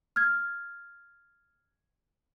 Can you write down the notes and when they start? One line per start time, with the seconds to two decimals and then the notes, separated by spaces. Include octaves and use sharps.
0.16 F6 G#6